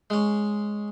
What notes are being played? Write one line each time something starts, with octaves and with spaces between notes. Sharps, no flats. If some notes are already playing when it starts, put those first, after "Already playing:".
G#3 C#4